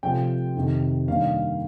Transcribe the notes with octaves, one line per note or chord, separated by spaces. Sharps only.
C3 F3 A3 G5
F2 C3 D#3
G2 D#3 A#3 F5